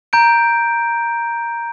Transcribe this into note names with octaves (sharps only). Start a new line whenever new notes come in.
A#5 G6 D7